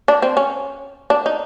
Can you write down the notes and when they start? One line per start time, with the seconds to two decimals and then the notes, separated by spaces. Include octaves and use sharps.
0.08 D4
0.22 C4
0.37 C#4
1.10 D4
1.26 D#4